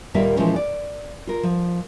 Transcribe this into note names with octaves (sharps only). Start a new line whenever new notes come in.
D#2 A#2 D#3 G3 A#3 E5
A#2 E3 F3 G#3 C#4 D#4
D5
F4 A#4
F3